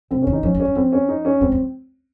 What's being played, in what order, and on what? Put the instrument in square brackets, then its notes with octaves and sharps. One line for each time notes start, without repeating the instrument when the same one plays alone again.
[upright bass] C3 [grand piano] C4
[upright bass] D#3 [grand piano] C#4
[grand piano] D#4
[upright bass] F3 [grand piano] C#4
[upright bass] G#3
[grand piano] C#4
[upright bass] G3
[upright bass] F3 [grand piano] C4
[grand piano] C#4
D#4
C#4
[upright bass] G#3 [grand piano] C4
[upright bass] G3